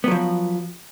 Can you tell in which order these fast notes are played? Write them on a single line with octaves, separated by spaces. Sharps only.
B3 F#3 F3